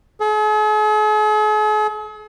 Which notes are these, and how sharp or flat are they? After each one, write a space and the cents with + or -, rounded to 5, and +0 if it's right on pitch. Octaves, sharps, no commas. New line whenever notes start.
G#4 +45